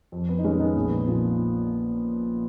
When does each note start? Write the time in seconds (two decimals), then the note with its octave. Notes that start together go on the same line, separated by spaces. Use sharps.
0.12 F2
0.29 B3
0.39 D#4
0.44 D#3 G#3 C#4
0.60 B3 D#4
0.76 A#1
1.08 A#2 F3